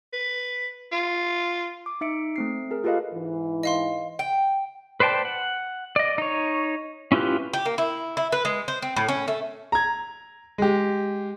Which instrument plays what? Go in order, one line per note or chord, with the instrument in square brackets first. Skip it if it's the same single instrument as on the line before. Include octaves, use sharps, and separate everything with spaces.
[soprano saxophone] B4
F4
[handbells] D6
D#4 E5 C#7 D7
A3 C4 C7
G#4 A#4
F4 G4 A4 B4 D#5 F5
[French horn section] G#2 E3
[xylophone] D#5 F5 C6
[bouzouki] G5
[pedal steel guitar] B4 C5 D5 G5 A5
F#5
D5 D#5
D#4 C#5
C#4 E4 F4 G4 B4
[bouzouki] G4
A#3
E4
E4
B4
G#3
C5
C4
A2
C#4
A3
[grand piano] A#5 G#6
G#3 G4